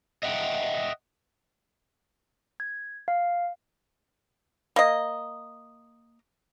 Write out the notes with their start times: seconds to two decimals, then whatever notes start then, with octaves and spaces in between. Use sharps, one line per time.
0.23 D#5 E5 F#5 G5
2.60 G#6
3.08 F5
4.76 A#3 D#5